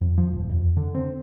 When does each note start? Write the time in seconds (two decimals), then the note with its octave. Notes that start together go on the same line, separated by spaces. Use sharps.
0.01 F2
0.18 F3
0.33 D#1
0.51 F2
0.77 D3
0.95 C4